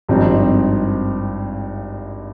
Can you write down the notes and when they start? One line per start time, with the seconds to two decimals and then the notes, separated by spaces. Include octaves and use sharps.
0.09 G#1 G2 F3 C4 D#4